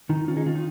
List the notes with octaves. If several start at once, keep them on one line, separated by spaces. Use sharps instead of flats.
D#3 D#4
C#4 F4
D#4 G#4
D#3 F4
D#4